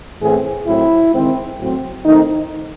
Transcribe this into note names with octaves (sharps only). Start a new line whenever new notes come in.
A2 E3 C4 G#4
A2 F#3 C4 E4
D#3 G#3 C4
A2 F#3 C4
D#3 A3 C4 D#4